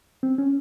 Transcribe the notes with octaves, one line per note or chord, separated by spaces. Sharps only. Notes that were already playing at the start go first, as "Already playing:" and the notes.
C4
C#4